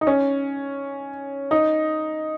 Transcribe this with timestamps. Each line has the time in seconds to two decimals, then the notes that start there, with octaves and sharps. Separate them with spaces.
0.01 D#4
0.07 C#4
1.51 D#4